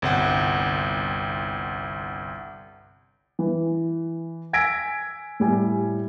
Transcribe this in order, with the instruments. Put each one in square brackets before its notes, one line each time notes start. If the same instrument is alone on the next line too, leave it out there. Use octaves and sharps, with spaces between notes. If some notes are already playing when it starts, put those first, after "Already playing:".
[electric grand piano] G1 C2 F#5 G5
[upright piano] E3
G#5 E6 G#6 A#6 B6 D7
A2 G3 G#5